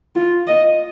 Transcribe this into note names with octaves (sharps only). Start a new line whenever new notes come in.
F4
D#5